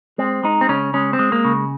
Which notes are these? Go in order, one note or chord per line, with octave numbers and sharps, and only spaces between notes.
G#3 C4
G#3 D#4
C4
C#3 C#4
G#3 C#4
C4
G#3
A#3
C#3